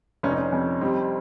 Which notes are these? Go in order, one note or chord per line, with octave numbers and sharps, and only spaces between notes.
F1 C#4
D#4
C#4
F2
G3 C4 D#4